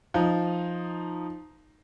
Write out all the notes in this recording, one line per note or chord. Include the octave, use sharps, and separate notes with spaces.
F3 D#4